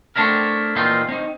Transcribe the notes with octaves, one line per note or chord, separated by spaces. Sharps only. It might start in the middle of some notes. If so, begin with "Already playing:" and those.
A3 C4 D4 E4 A#4
A#2 E3 C4 D#4 F4 C6
C4 D#4